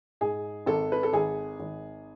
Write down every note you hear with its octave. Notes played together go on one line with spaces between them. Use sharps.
G#2 G#4
G#1 A4
B4
A4
G#1 G#4
G#1